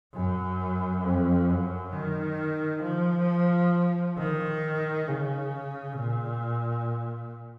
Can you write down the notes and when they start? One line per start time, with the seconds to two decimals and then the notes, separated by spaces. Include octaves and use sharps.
0.14 F#2
1.04 F2
1.49 F#2
1.93 D#3
2.82 F3
4.17 D#3
5.07 C#3
5.97 A#2